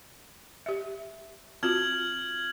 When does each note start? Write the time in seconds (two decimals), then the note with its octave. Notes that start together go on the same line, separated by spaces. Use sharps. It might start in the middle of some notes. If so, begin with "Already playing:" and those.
0.66 G4 E5
1.63 C4 F4 F#4 F6 G#6 F#7